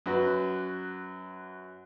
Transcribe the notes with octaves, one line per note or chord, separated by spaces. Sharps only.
F#2 F#4 B4